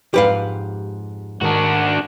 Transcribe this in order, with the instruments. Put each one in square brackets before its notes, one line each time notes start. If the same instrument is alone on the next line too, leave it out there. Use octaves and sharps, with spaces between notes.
[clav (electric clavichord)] F2 G#2 [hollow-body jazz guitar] G4 B4 F5
[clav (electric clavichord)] G#2 D#3 A#4 [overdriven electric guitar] D4 F#4